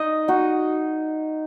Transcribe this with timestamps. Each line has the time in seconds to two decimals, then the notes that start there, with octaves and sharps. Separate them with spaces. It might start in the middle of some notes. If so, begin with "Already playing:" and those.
Already playing: D#4 D#5
0.28 D#4 F#4